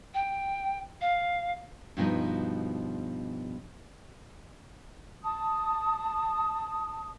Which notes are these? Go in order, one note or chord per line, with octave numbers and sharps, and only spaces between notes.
G5
F5
G2 B2 F3 D#4
A5 D#6